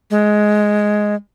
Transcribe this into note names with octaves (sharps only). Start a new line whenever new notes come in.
G#3